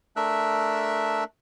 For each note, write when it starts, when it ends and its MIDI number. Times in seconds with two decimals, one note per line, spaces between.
0.16 1.24 57
0.16 1.24 62
0.16 1.24 70
0.16 1.24 76
0.16 1.24 88
0.16 1.24 90